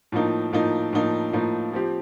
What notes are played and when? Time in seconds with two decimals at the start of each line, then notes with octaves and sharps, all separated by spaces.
0.12 A2 F3 A#3 D#4
0.52 A2 F3 A#3 D#4
0.93 A2 F3 A#3 D#4
1.33 A2 F3 A#3 D#4
1.73 F3 C4 G4